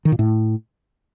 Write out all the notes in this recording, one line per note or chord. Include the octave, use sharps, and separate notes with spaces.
D#3
A#2
A2